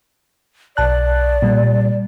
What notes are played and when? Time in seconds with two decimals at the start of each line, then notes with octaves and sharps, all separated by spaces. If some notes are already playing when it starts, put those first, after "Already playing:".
0.77 B1 D5 A5 F#6
1.42 A#2 G3